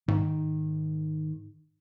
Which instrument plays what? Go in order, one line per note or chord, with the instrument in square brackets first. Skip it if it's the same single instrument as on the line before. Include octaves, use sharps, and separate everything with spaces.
[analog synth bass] G#2 [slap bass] D#3